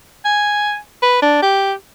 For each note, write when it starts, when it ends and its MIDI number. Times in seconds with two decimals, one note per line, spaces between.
0.25 0.76 80
1.02 1.19 71
1.22 1.39 62
1.42 1.73 67